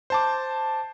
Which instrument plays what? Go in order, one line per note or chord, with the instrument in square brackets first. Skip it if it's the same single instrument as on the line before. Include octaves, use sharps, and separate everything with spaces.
[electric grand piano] C5 A5 D6